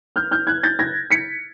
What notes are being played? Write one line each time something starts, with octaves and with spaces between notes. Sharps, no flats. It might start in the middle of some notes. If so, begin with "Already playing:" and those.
F6 G6
F6 G6
F#6 G#6
G6 A6
G#6 A#6
B6 C#7